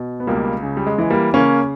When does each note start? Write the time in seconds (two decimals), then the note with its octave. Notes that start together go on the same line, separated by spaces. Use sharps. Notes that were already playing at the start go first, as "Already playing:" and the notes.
Already playing: B2
0.20 B3
0.27 C#2 G3 A#3
0.63 C#3
0.77 G3
0.87 G#3
0.98 E3 G#3
1.10 G3 A#3
1.34 C#3 A#3 C#4